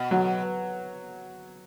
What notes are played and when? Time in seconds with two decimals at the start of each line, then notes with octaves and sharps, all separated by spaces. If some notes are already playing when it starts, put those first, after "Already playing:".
Already playing: B2
0.11 F#3